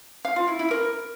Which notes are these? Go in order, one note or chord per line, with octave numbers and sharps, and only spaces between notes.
F5
F4
E4
E4
A#4